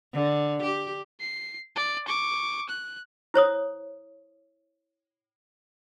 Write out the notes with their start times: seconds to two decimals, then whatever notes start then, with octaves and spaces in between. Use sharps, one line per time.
0.13 D3
0.63 G4
1.20 C7
1.76 D5
2.08 C#6 D6
2.69 F#6
3.34 E4 C5 C#5 D#6